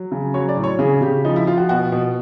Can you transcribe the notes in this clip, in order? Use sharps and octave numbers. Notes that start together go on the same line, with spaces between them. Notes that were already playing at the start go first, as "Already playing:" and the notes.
Already playing: F#3
C#3
F#3 C#5
D5
A2
C#5
C#3 G#4
C#3 G4
F3 D#4
E4
F3 F4
F#4
B2 F#4
B2